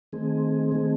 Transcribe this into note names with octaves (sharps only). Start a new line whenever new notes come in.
D#3 A3 C4 G#4
D#3 A3 C4